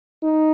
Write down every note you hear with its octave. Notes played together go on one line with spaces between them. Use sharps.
D#4